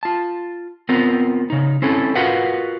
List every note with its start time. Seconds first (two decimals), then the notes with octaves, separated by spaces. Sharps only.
0.03 F4 A5
0.89 B3 C4 F4 A#4
1.50 C#3 D#4
1.82 C4 C#4 E4 A4
2.15 F4 F#4 A#4 B4 F5 F#5